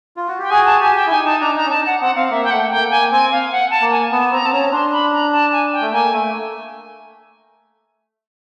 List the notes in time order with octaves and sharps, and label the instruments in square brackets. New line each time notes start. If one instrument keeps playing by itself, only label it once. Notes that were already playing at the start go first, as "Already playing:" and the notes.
[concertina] F4
F#4
[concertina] G4 [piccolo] G5
[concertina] F#4 G#4 [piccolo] G#5
[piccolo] A5
[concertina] G4 [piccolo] G#5
[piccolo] G5
[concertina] E4
[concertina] D#4 [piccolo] G#5
[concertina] D#4 [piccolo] A5
[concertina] D4 [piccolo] A#5
[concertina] D#4 [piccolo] A#5
[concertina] C#4
[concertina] D4 [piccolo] A5
[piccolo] F#5
[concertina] C4 [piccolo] F#5
[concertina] C4 [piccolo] F5
[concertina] A#3 [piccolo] E5
[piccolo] G5
[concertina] A3 [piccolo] F#5
[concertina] A#3 [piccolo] G5
[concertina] A#3 [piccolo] G#5
[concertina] C4 [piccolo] G#5
[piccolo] F5
F#5
A5
[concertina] A#3
[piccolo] G#5
[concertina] B3 [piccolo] A5
[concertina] C4 [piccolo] A#5
[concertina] C4 [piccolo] A5
[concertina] C#4 [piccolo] A#5
[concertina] D4 [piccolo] C6
[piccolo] B5
A#5
A5
G#5
G5
[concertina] A3
[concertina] A#3 [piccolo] G#5
[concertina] A3